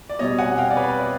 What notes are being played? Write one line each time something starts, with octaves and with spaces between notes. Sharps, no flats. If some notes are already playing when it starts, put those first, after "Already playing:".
D5
B2 G3 C4 C#5 D#5
F#5 G#5
F5 G5
D5
B4 C#5
D5